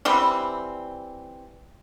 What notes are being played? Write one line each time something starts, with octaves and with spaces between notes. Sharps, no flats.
E3 G3 C4